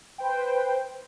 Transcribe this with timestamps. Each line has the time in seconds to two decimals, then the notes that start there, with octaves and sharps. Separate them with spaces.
0.18 B4 C5 G5